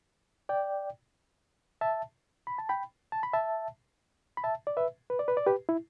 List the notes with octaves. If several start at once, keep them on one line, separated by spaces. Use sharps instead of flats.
D5 G5
E5 A5
B5
A5
G5 B5
A5
B5
E5 A5
B5
E5 A5
D5
B4 E5
B4
D5
B4
D5
G4 B4
E4